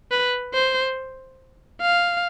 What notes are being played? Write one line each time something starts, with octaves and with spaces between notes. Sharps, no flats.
B4
C5
F5